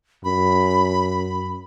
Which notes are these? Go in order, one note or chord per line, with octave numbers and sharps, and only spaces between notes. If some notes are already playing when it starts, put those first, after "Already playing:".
F#2 B5